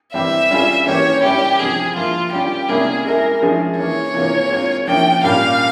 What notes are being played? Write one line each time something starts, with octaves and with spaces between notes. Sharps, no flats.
E3 G3 C4 G4 E5
G3 C#4 F4 G#4
E3 A#3 C#4 G4 C#5
G3 C#4 E4 G4
C3 F3 C4 G#4
F3 A#3 E4 F4
G3 C#4 F4 G4
C3 G3 A#3 C#4 E4 G#4
G#3 E4 G#4 A#4
F3 G#3 C#4 E4 G#4
E3 A#3 E4 G#4 C#5
C3 E3 A#3 F4 G#4
G#3 C4 F4
F3 A#3 C#4 E4 G5
A#2 G3 C#4 G4 F5